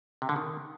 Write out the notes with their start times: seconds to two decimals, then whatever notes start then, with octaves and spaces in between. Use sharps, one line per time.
0.22 C3
0.29 D3
0.36 D#3